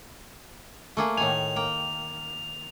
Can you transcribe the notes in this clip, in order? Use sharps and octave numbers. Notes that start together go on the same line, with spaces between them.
A3 A#3 G#4
A2 D#3 G#5 F7
A#3 G5